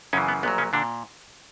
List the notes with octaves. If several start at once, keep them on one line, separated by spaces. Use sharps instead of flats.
F#2 C#3 E3 C#4
B3
A#1 A#2 F#3 B3
C#3 C#4
A#2 D3 D4